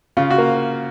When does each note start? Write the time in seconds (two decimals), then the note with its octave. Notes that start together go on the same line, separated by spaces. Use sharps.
0.17 C#3 F4
0.30 F#4
0.38 A#3